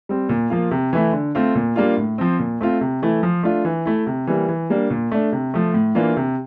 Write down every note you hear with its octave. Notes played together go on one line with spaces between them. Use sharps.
G3 C4
A#2
F3 A#3 F4
C3
E3 A3 E4
D3
A3 C4 F4
A#2
G3 A#3 D4 F4
A2
F3 C4
A#2
A3 C4 F4
C3
E3 A3 E4
F3
A3 D4 F4
E3
A3 E4
C3
E3 G3 A#3
E3
G3 A#3 D4
A#2
A3 D4
C3
F3 A3
A2
E3 A#3 D4 F4
C3